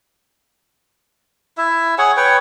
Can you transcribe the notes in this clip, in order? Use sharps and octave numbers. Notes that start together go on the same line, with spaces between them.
E4 E5
G#4 C#5 F#5 G#5
B4 C#5 G5 C#6